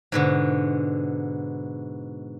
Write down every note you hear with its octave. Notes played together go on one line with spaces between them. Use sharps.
G#2 B2 D3